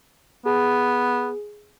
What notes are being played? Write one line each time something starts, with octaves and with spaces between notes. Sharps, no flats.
B3 G#4